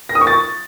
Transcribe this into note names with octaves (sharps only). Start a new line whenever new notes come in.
A#6
D#6
C#6
A6